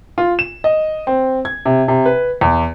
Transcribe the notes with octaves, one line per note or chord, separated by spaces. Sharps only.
F4
E7
D#5
C4
G#6
C3
C3
B4
E2